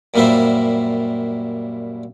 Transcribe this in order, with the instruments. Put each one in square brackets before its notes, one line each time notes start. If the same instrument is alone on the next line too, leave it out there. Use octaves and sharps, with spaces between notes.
[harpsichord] F#2 A#2 G3 A#3 E4 C5